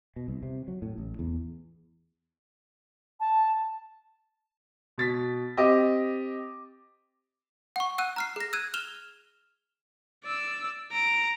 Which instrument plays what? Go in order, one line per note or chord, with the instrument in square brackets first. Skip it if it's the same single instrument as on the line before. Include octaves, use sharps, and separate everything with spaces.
[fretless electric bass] B2
C2
C3
F#3
A2
A1
E2
[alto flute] A5
[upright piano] B2 A6 B6
C4 G4 D#5 D6
[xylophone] F#5 C#6
F#5 E6 F#6 D#7
A#5 F6 C7
G#4 A#6
E6 F#6 G#6 D#7
F6 E7 F7 G7
[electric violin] D5 E6
A#5 D7